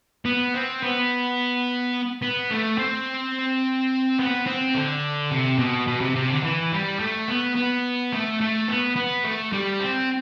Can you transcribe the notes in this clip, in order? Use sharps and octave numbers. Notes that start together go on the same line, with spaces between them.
B3
C4
B3
B3
A3
C4
B3
C4
D3
C3
B2
B2
C3
C3
D3
E3
G3
A3
B3
B3
A3
A3
B3
B3
A3
G3
C4